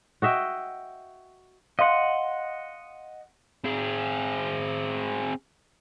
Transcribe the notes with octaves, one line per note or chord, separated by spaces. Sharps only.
F#4 D#5 E5 G5
D#5 F5 F#5 C6
C4 G#4